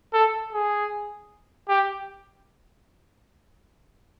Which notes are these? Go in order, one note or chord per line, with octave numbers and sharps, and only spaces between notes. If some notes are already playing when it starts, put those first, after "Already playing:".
A4
G#4
G4